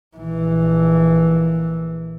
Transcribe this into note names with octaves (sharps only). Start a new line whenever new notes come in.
A#1 E3